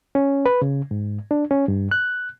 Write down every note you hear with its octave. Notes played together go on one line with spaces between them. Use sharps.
C#4
B4
C#3
G#2
D4
C#4
G2
F#6